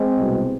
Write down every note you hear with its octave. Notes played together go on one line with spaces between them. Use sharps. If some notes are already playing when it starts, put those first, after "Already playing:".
Already playing: G#3 C4
C2 B2